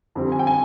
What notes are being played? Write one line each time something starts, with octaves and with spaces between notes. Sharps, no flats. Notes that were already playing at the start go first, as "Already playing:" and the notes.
F2 D3 G3 C4
G#5
G5
G#5